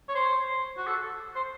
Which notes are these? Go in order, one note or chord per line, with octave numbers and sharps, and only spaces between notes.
C#5
C5
F#4
A4
C5